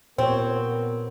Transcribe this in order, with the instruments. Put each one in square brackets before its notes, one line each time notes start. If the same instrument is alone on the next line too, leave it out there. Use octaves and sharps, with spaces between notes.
[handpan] A#2 G4 C#5 [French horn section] B3 A#4 [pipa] C4 [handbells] C5